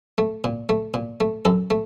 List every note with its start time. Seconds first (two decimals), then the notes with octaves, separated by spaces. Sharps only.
0.18 A3
0.44 A#2
0.69 A3
0.94 A#2
1.20 A3
1.45 F#2 A4
1.70 A3